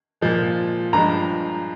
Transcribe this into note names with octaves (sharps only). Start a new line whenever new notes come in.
A#2 F3 G#3
G2 F3 G#3 A#5